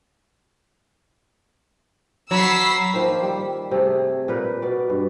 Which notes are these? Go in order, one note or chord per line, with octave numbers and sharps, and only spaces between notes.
F#3 B5 E6 B6 C7
D#3 F3 A#3
G3
C3 A3 G#4
A#2 A#4 B4
B2 D5
G2